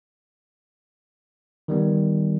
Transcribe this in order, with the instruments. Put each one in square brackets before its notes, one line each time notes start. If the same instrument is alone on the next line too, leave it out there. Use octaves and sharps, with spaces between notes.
[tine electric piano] D#3 G3 B3